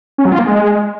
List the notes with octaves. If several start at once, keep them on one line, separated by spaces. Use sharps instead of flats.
C#4
F#3
F4
A#3
G#3